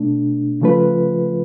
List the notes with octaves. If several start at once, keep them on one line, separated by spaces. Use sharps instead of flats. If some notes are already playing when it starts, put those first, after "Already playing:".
Already playing: B2 A3 D4
C#3 F3 A3 F4 B4